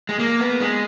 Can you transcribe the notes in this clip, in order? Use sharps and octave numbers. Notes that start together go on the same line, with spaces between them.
G#3
A#3
B3
G#3